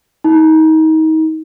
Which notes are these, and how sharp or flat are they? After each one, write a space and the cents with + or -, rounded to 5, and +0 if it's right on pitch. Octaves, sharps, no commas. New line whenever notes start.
D#4 +30